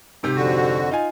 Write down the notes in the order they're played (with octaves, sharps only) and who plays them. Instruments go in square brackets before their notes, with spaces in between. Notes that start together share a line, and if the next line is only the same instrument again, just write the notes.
[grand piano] G#2 C3 G4
[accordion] F2 D3 F#4
[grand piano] D#4 F4 G#5